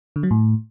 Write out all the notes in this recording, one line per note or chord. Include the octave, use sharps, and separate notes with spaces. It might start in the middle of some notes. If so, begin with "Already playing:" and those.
D3
F#3
A2